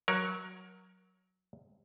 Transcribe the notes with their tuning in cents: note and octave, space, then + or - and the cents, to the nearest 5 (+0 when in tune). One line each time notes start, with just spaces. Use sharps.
F#3 +0 A#4 +20 C#5 +0